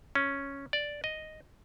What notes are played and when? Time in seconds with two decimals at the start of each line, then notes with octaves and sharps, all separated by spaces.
0.15 C#4
0.73 D5
1.04 D#5